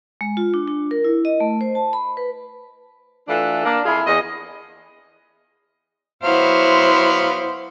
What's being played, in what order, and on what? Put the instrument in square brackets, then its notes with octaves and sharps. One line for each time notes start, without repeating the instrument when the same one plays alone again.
[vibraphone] G#3
F4
D4
D4
A#4
E4
D#5
A3
C5
A5
B5
B4
[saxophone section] E3 A3 D4 F4 A4
A#3 D4
F2 E4 F4 G#4
E2 D#5
[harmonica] F#3 B3 F5 [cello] E4 C5